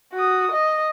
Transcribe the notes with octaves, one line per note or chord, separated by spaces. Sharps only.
F#4 D#6
D#5